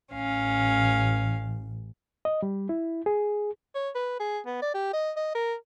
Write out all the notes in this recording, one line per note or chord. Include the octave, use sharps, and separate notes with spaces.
A1 C#4 F5
D#5
G3
E4
G#4
C#5
B4
G#4
B3
D5
G4
D#5
D#5
A#4